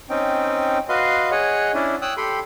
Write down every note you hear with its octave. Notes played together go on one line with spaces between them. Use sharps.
C4 C#4 D#4 G5
F#4 B4 D#5 F5 C6
G#4 C#5 D#5 F#5
C#4 D4 E4
C#5 G5 D#6 E6 F#6
G4 A4 G5 B5 C6